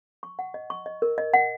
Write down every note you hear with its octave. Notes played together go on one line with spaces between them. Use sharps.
C#6
F#5
D#5
C#6
D#5
A#4
D#5
F#5